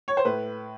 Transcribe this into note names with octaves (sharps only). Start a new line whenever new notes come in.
C#5
C5
A2 B4